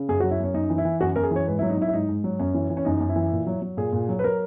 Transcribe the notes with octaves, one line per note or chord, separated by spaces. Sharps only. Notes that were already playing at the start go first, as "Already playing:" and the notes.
Already playing: C#3
F#2 G#4
F#4
F#3
E4
F#2 C#4
F#2 D#4
E3
E4
E3
F#2 F#4
F#2 A#4
G#4
E3 C#5
G#2 B4
E4
F#3
D#4
F#3 E4
E4
G#2 D#4
G#2
F#3
F#2 C#4
E3
E3
C#4
F#2 D#4
F#2
E4
E3
A#2
F#3
F#3
A#2 G#4
A#2
F#3
B4
F#3 A#4